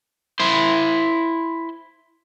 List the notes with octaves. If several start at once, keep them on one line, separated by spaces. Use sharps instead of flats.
E4 C5